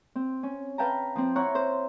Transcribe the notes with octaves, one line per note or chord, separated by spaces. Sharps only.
C4
C#4
B4 F5 G5 A5 A#5
F3 C4
E4 C#5 F#5 A#5 C#6 F#6
C5